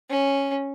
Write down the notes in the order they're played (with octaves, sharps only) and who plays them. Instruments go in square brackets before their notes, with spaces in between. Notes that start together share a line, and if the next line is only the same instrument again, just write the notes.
[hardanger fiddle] C#4